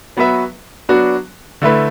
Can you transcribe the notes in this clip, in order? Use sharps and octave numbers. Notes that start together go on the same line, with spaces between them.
F#3 B3 F#4 B4 E5
F#3 B3 D4 F#4
D3 A3 E4 B4